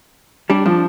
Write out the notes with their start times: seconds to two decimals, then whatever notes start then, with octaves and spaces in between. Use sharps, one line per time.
0.50 G3 D4
0.66 F3 D4